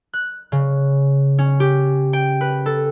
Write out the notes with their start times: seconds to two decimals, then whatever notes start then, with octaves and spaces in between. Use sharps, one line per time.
0.14 F#6
0.52 C#3
1.39 C#4
1.60 G4
2.13 G5
2.41 B4
2.66 A4